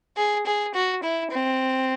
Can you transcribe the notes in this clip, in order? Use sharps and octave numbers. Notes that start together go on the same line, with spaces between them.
G#4
G#4
F#4
E4
C4